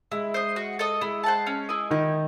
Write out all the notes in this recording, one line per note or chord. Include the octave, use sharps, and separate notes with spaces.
G#3 E4
C5 D#5
F#4
A4 D#5
G#3 E4
C5 F#5 A5
C#4
E4 G#4 D#5
D#3 D#4 E4